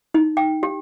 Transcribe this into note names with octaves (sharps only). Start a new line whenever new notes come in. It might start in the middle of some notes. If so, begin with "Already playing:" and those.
D#4
G5
G4